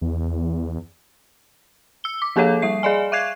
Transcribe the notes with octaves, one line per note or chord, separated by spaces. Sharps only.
E2
E6 G7
D6
F3 A#3 G#4 A4 C#5 F5
G3 E5 C7
G#4 D5 D#5 G#5
E5 F5 F#6 G#6 C7